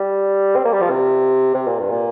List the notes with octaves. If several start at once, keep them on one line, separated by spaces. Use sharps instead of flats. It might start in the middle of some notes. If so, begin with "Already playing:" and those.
Already playing: G3
C4
A#3
G3
F3
C3
C3
A#2
G2
A#2